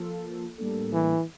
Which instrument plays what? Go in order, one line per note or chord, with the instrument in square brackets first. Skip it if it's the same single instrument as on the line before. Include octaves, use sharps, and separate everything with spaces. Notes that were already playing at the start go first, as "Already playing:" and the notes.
Already playing: [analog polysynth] F3 A#3 F4 A4
A2 G3 A#3 D4 A4
[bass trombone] E3